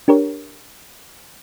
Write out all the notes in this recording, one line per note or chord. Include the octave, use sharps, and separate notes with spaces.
D4 G4 A#4 C#5